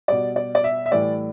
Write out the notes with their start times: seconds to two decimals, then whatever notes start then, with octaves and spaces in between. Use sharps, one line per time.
0.08 B2 G3 D5
0.36 D5
0.55 D5
0.64 E5
0.86 E5
0.92 A2 E3 G3 D5